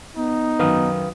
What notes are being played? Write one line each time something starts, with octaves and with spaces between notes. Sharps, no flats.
B3 D#4
F#2 D#3 B4 F5 D#6